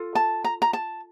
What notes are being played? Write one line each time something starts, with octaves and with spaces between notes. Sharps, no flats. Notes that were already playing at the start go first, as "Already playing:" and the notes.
Already playing: F4 A4
A5
A#5
A#5
A5